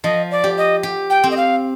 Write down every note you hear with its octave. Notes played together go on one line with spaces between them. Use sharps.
F3 D#5
D5
G4
D#5
G4
G5
C4
D#5
F5